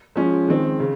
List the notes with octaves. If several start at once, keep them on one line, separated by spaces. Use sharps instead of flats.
F3 G#3 C#4
D#3 G#3 C4
C#3